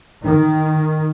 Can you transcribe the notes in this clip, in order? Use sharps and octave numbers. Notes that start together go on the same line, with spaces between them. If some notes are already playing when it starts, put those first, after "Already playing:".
D#3